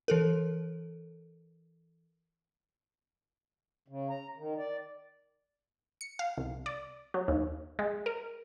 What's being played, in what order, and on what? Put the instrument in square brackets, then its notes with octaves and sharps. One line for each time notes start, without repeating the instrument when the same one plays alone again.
[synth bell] E3 A4 A#4
[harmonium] C#3
A#5
D#3
D5
[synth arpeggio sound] C#7
F5
C2
D5
F#3
D#2
G#3
A#4